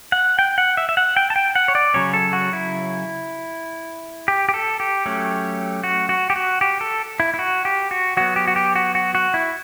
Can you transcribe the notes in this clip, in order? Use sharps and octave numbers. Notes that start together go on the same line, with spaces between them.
F#5
G5
F#5
E5
E5
F#5
G5
A5
G5
F#5
C#5
D5
C#3 F#3 C#4 C#5
A4
F#4
E4
G4
G4
A4
G4
F#3 A3 C#4
F#4
F#4
G4
F#4
G4
A4
E4
E4
F#4
G4
F#4
F#3 B3 F#4
G4
F#4
G4
F#4
F#4
F#4
E4